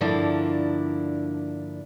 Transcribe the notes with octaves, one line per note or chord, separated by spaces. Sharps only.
G2 D3 F3 A#3 D4 E4